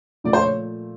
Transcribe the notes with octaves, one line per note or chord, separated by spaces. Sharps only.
A#2 F3 A3 D5
C5
C#5